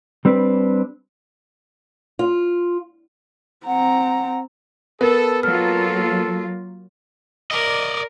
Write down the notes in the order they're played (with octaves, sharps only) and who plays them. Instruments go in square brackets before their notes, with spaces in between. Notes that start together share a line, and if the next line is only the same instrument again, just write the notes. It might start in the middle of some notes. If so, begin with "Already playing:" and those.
[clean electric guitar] G3 C4 D4 B4
[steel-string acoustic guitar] F4
[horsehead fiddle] C4 A#5 [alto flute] F#5
[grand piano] B3 [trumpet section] A4 [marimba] A#4
[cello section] F#3 A#3 F4 [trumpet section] A4 [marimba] F6
[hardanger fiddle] A#4 [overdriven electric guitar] D5 D#5